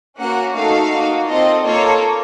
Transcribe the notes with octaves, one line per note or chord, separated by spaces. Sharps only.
A#3 C#4 F#4 F#5
A3 D#4 F#4 A4 F5
A#3 D#4 F#4
C4 F4 A4 D#5
A#3 F4 A4 C#5